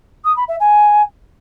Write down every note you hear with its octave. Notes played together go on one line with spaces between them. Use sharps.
D#6
B5
E5
G#5